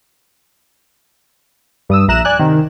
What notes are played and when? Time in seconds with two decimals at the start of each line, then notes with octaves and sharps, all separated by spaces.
1.89 G2 D#6 E6
2.08 A#1 E5 A#5 F#6 E7
2.25 D5 G#5 F#6
2.39 C3 D#3